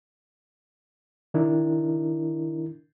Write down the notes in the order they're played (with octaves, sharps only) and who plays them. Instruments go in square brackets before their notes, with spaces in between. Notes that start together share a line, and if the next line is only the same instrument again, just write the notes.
[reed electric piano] D#3 D4 E4 A#4